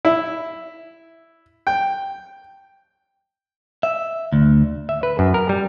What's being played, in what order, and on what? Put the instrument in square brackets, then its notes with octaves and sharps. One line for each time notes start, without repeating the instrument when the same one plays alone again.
[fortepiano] E4
G5
[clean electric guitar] E5
D2
[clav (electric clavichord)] E5
B4
F#2
A#4
G3